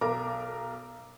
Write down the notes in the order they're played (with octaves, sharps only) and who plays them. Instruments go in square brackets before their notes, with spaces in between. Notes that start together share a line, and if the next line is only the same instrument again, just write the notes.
[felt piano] B1 A#4 A#5 D6